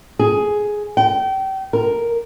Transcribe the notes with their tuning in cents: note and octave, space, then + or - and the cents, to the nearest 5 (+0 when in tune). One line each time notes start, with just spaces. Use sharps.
G#4 +5
G5 -30
A#4 +0